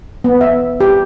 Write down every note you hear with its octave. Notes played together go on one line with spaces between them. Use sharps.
B3
E5
G4